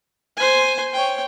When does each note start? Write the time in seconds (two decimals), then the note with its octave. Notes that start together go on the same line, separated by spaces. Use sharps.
0.37 C5 G#5
0.94 C#5 G5